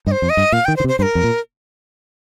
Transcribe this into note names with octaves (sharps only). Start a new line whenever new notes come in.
G2 D#5
C5
F2
D#5
G2
A#2 F5
D#3 G5
C5
D#3
C3
C5
G2 C5
A#4
F2
A#2